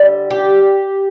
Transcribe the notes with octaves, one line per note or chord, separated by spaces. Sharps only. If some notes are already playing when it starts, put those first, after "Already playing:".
Already playing: D3 G3
G4